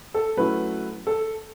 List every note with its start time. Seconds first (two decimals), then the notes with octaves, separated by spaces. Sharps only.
0.14 A4
0.37 F#3 A3 C#4 E4 B4
1.07 A4